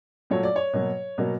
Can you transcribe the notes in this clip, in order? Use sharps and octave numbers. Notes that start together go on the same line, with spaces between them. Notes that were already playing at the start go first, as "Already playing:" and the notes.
A#2 F#3 A3 C#5
D5
C#5
B2 F#3 A#3
B2 F#3 A#3